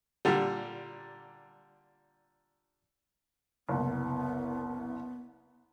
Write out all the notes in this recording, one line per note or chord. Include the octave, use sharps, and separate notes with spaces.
A#2 D3 G3
F#1 C2 B3